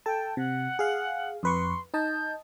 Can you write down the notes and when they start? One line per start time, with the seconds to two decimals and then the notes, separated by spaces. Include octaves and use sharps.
0.06 A4 G5 A5
0.37 C3 F#5
0.79 G#4 F5
1.43 F2 B4 C6 C#6
1.94 D#4 D#5 A5 G6